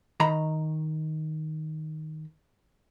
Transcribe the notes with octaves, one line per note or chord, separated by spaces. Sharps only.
D#3 A#5 B5